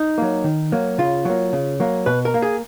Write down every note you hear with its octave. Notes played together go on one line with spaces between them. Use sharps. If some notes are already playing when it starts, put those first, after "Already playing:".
Already playing: D#4
F#3 A#3
D#3
F#3 A#3
C#3 F4
F#3 A#3
C#3
F#3 A#3
B2 B4
A#4
A#3
G#4